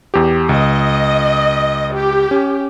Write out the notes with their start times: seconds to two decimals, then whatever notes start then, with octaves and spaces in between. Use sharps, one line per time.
0.14 E2 G4
0.49 C#2 D#5
1.93 G4
2.31 C#4